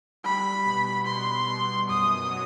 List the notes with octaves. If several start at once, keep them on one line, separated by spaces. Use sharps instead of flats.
G3 B5
B2
B2 C6
B2
F#2 D#6
F#3